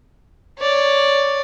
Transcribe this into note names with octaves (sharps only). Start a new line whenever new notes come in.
C#5 D5